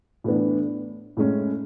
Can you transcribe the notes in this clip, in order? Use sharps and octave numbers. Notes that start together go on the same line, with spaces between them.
A2 E3 B3 D4
A2 G#3 C#4